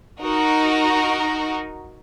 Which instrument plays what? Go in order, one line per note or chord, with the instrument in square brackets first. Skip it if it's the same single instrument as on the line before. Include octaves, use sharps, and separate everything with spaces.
[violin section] D#4 F#4 A#4